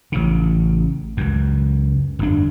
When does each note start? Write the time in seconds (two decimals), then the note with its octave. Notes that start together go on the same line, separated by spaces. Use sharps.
0.12 A1 C#3
1.17 C#2 F#2
2.19 G1 F2 D4